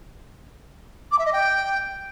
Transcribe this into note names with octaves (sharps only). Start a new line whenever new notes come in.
D6
E5
D#5
G5